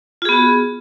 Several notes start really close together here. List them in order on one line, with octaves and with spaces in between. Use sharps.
F4 G#4 B3 F#4